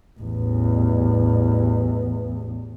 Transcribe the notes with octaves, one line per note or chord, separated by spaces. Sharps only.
A1 E2